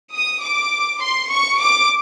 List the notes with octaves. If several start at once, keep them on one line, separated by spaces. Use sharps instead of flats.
D#6
D6
C6
C#6
D6